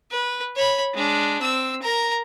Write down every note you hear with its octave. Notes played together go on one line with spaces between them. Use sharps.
B4
C#5 B5
G#3 D4
C4 E6
A#4 A#5